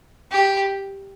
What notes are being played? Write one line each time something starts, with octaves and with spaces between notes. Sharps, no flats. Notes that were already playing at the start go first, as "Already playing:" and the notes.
G4